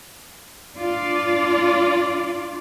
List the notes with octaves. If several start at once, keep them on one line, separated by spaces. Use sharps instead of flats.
D4 F4 D5